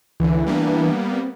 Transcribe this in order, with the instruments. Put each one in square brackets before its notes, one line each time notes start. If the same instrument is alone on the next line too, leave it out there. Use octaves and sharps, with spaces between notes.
[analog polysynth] C#2 D3 [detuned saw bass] E3
[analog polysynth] G3 A#3 B3 [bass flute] D4
[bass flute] C4